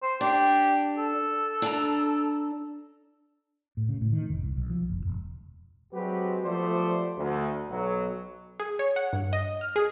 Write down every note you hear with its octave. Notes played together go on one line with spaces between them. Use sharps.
C5
D4 G4
A4
D4 A5 A#5
A2
C#3
A2
D#3
F1
C2
B1
F3
F#1
E1
F#3 G#3 C4 F#4 G4 B4
F3 A3 B3 G4 C5 D5
D2
B1 F#3
G#4
C#5
F#5
G2
D#5
F6
G#4